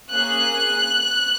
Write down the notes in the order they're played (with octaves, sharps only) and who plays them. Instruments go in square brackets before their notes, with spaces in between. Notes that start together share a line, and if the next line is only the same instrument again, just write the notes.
[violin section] A#3 C#4 G#4 F#6